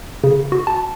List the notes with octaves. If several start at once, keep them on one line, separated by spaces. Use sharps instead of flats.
C#3
F#4
A5